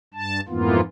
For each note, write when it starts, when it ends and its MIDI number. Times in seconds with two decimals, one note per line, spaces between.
0.14 0.40 43
0.14 0.40 81
0.48 0.80 41
0.48 0.80 44
0.48 0.80 52
0.48 0.80 58
0.48 0.80 59
0.48 0.80 65